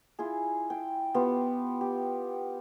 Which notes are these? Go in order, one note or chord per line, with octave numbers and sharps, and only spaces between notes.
E4 F4 G#4
G5
B3 F4 G4
G4